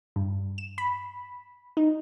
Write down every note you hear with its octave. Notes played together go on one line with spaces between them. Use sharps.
G2
E7
B5
D#4